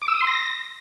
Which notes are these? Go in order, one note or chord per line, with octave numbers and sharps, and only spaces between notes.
D6
E6
D#6
C6
A#6